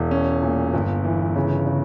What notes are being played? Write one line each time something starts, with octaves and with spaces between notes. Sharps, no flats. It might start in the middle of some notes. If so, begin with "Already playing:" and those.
Already playing: E1
C#4
A#2
G1
E3
C#3
C#3